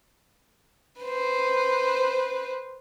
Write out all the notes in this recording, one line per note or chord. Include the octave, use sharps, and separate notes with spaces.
B4 C5